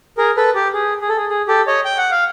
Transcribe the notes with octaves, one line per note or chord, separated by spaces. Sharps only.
G#4 A#4
A4 B4
G4
G#4
G#4
A4
G#4
G#4
G4 A4
C#5 D#5
G5
F#5
F5